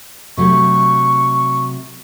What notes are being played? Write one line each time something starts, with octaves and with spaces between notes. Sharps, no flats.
C3 F#3 A3 C#6